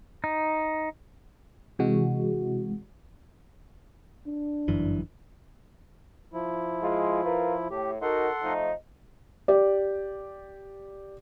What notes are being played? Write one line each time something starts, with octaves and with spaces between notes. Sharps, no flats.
D#4
C3 E3 G#3 F#4
D4
G1 F#2 E3
F3 E4
G#3 F4
F4 A#4 B4
A2 G4
D#4 F#4 A4 A#4 F#5 C6
F3 A3 D#4
G4 D5